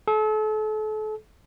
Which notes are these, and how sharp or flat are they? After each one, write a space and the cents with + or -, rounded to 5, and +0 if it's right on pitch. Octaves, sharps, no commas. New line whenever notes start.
A4 -35